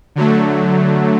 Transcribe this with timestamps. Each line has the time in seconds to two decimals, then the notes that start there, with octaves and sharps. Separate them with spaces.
0.16 D3 F#3 A3